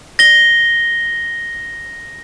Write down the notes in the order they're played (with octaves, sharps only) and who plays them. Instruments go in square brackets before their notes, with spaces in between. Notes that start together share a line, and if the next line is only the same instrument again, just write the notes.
[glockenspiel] A#6 G7